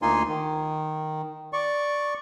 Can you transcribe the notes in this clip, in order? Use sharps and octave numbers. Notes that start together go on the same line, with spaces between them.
D2 A#3 D#4 F4 G#5 C6
D#3
D5 C#6